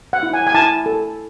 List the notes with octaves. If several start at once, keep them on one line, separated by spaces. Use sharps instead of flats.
F#5
E4
G#5
G#5
E4 A5
A4